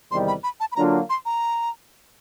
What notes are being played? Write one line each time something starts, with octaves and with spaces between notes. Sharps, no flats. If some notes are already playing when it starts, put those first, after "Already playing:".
E2 C3 D#3 G3 C6
B5
B5
A5
B5
D3 F#3 A#3 D4 F4 A#5
C6
A#5